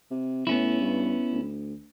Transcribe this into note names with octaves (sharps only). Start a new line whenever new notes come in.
C3
A2 B3 C#4 E4
G2
D2